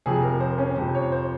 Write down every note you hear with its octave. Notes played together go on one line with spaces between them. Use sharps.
F2 C3 F3 G#4
A#4
C5
C#4
F2 C3 F3 C5
C#5
C5